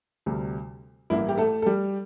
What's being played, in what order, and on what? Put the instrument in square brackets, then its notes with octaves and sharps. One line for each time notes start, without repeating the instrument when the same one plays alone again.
[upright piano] D2 C3 G3
A1 G2 E3 A#3 E4
G4
A3 A4
A4
G3 G4